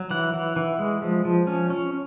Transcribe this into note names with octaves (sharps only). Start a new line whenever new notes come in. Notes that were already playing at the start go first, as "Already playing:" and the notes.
Already playing: F#3
E3 F#5
E3
E3
G#3
F3
F3
C#4
C#4